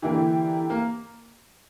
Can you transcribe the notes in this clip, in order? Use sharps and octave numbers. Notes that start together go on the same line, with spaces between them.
D3 E3 A#3 E4 G4
A#3